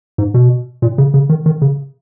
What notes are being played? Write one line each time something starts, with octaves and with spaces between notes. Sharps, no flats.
G#2
B2
A#2
C#3
C#3
D#3
D#3
C#3